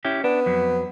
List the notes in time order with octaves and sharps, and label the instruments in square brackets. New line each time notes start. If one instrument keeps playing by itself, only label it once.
[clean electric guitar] C#4 E4 G4
[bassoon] B3 [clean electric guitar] D4
[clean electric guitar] F2 F#3